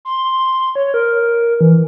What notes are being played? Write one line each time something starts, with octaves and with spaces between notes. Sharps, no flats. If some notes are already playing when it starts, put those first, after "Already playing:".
C6
C#5
A#4
E3